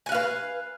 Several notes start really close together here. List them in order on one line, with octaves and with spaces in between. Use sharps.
G#5 F#5 F5 B4